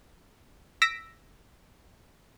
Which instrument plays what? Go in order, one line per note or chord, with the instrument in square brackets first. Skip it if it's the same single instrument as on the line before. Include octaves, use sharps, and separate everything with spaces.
[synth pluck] E6 A#6 B6 D7